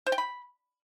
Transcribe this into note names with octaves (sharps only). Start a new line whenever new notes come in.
C5
G5
B5